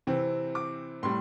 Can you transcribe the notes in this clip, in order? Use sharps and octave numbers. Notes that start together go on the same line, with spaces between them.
C3 E3 C4
D6
A2 G3 C6